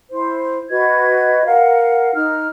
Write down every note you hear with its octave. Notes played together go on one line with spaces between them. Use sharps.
E4 C5
F#4 B4 D#5 G#6
A#4 F5 F#5
D#4 F6